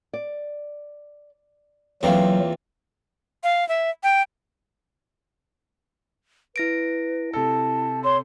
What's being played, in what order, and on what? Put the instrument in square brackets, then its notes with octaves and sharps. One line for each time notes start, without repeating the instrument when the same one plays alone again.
[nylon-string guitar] D5
[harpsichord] E2 E3 A#3 [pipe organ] F#3 [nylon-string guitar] C4 F4 F5
[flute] F5
E5
G5
[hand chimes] E4 A#6 D7 [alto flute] B4
[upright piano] C3 A4 [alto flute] A5
[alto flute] C#5 [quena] C6